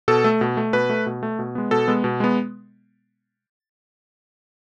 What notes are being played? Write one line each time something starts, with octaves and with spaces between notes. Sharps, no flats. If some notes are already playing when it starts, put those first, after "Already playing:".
B2 A4
A3
B2
A3
B2 B4
A3
B2
A3
B2
G#3 B3
B2 A4
G#3 B3
B2
G#3 B3